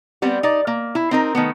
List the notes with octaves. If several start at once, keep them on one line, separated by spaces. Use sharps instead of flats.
G3 B3 C4
D#4 D5
A#3
E4
C4 D#4 A#4
D#3 A3 B3